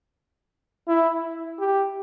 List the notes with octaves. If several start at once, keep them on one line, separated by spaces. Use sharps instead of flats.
E4
G4